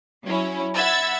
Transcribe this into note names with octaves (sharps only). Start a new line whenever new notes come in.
F#3 C#4 E4
E5 F#5 B5 E6 G#6 A6